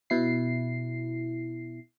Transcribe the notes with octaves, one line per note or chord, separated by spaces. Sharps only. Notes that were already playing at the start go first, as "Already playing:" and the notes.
B2 E4 C7